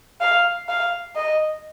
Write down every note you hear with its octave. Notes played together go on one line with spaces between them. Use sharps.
F5
F5
D#5